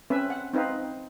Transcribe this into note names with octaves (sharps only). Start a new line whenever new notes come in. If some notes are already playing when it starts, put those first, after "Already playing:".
C4 C#4 B4 E5
F#5
C4 D#4 B4 F5